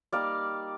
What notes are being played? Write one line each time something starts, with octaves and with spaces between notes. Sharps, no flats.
G3 A#3 D#4 D5 F5